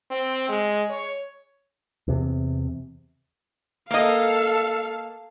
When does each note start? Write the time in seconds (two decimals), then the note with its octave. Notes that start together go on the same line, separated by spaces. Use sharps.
0.11 C4
0.49 G#3
0.90 C#5
2.08 E2 C3
3.91 A#3 A4 D#5 F5